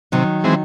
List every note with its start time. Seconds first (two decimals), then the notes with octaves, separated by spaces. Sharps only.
0.12 C3 D#3 F#3
0.44 E3 G#3 C4